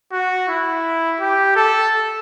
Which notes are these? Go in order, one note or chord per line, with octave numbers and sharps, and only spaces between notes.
F#4
E4
G4
A4